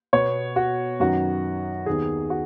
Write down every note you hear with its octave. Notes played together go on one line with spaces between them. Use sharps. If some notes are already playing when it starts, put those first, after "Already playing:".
B2 B3 C#5
F#4
F#2 D#3 F#3 B3 F#4
D#2 D#3 B3 G#4
F#4